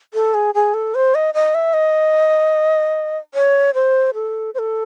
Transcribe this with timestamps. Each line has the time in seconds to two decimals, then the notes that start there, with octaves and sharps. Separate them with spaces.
0.14 A4
0.34 G#4
0.54 G#4
0.74 A4
0.95 C5
1.15 D#5
1.34 D#5
1.54 E5
1.73 D#5
3.34 C#5
3.74 C5
4.14 A4
4.54 C5
4.59 A4